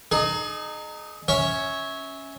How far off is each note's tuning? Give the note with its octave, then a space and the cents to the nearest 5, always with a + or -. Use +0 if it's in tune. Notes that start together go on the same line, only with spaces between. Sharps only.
D#4 -25 G#4 +35
C#4 +0 C#5 +0 E5 -20